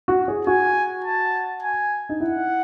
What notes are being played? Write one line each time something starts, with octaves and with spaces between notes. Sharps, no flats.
F#4
G#4
F#4 G#5
A5
G#5
D#4
E4 F#5